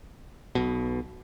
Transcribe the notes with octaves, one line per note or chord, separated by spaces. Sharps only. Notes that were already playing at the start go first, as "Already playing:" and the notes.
B1 B2